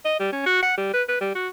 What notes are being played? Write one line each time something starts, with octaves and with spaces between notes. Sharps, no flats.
D#5
G3
C#4
F#4
F#5
G3
B4
B4
G3
F#4